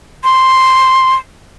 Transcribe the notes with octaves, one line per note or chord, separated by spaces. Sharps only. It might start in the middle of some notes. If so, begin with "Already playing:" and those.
C6